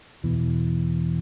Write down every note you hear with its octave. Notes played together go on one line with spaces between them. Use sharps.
E2 B2 E3